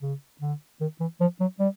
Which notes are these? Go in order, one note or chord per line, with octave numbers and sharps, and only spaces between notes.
C#3
D3
D#3
E3
F3
F#3
G3